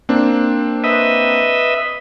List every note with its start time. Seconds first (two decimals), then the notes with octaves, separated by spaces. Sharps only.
0.09 A#3 C4 D4
0.84 B4 D#5 E5